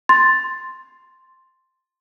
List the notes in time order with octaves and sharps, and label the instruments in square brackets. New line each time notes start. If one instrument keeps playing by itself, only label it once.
[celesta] C6 A6